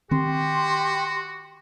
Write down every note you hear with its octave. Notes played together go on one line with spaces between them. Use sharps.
D#3 C4 F#4 G4 C6